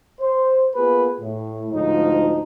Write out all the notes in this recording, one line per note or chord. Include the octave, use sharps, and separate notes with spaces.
C5
A#3 B3 F4 G#4 B4
A2
D2 G#2 F3 D#4